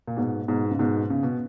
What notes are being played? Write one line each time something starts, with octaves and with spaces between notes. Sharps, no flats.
A#2
G#2 B2
G#2 B2
C#3
G#2 B2
C#3
B2